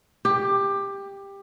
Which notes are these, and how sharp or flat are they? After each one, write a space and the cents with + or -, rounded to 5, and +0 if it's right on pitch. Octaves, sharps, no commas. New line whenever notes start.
G4 +15